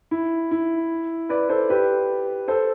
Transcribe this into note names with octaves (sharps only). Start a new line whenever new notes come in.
E4
E4
B4 D5
A4 C5
G4 B4
A4 C5